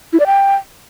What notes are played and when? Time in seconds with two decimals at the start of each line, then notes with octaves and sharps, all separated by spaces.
0.13 E4
0.20 D5
0.26 G5